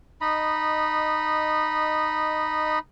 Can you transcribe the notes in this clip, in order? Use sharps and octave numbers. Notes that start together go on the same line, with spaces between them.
D#4 D#5 B5